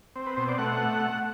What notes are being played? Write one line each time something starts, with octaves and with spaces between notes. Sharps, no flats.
C4
B4
B2 C5
D5
A3 F#5